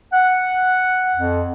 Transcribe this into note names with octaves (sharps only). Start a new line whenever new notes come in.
F#5
F2